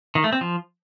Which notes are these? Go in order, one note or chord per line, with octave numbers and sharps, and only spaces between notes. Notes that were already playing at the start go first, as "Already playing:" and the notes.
D#3
A3
C4
F3